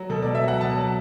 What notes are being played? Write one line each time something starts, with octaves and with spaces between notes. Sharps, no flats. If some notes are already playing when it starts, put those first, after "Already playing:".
Already playing: F#3
B2 A4
B2 D5
E5
F#3 F#5
B2 A5
F#3